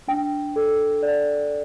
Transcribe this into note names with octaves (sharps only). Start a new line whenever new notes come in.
D4 G5
A4
D5